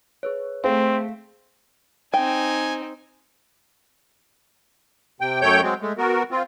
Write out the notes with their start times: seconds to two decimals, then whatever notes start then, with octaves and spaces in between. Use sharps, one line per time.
0.23 G#4 B4 C#5
0.64 A3 C4 G#4 C5 F5
2.14 C4 D#4 G5 G#5
5.21 C3 G5
5.41 F#2 A3 C#5 G5 G6
5.62 F#3 G#3 C4
5.82 G#3 A3
5.98 B3 F#4 A#4
6.31 C4 F4